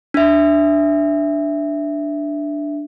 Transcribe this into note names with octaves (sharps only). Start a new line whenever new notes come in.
D4 E5